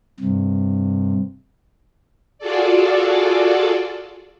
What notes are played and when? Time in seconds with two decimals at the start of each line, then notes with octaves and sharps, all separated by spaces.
0.20 G2 C3
2.38 F4 F#4 G#4 A4 D5